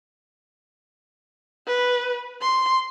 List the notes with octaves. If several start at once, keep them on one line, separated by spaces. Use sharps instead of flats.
B4
C6